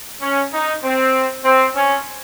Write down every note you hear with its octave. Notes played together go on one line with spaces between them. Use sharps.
C#4
D#4
C4
C4
C#4